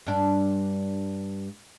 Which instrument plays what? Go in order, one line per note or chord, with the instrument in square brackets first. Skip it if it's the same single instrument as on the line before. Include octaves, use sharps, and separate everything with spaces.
[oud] G2 D4